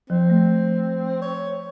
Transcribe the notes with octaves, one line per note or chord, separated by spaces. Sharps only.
F3 C4
A3
C#5